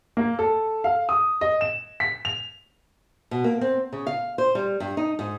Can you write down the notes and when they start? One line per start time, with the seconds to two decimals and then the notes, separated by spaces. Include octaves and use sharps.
0.17 A#3
0.39 A4
0.84 F5
1.09 D#6
1.41 D#5
1.61 E7
2.00 B6
2.25 F7
3.31 B2
3.44 A#3
3.61 C4
3.93 C#3
4.07 F5
4.38 C5
4.55 G3
4.80 G2
4.97 D#4
5.19 G#2